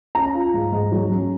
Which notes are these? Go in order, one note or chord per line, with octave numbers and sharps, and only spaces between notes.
C#4 A#5
F4
G#2
G#2
F#3
C#4